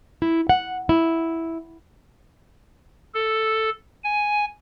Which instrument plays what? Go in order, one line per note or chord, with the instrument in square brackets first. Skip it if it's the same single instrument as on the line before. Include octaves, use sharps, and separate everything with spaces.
[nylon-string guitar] E4
F#5
E4
[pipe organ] A4
G#5